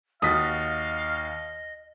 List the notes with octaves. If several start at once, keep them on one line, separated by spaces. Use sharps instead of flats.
D#2 F#4 D#5 F5 D#6 A6 B6